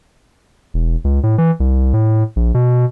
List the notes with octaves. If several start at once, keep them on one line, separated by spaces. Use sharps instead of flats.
E1
C#2
A2
E3
C2
A2
A#1
B2